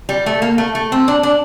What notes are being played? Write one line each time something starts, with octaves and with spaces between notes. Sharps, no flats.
G3
A3
A#3
A3
A3
C4
D4
D4